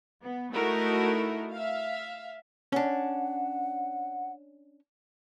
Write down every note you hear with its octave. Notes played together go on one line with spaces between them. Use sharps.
B3
A3 D#4 E4 F#4 A4 A#4
E5 F5
C#4 D4 F#5